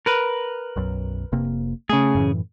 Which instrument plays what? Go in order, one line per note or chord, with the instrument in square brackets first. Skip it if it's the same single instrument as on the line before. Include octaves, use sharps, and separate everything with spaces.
[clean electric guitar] A#4 B4
[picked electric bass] B1 F#2
F1 C3 A#3
[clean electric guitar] C#3 G#4 [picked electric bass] A3
[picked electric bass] F#2 A2 E3